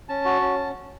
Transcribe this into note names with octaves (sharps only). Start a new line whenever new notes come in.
C#4 A5
F#4
C#4